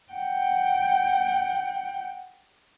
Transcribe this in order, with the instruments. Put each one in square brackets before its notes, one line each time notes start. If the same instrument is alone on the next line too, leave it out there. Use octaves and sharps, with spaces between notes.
[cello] F#5 G5